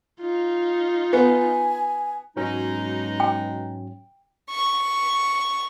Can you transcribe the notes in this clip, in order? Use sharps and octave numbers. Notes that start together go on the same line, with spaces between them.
D#4 F4
B3 G#5
G#2 B2 F#3 G#3 C#4 D#4
G5
C#6